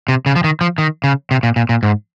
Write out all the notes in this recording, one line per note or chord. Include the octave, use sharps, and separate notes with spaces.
C3
C#3
F3
D#3
F3
D#3
C#3
C3
A#2
A#2
A#2
G#2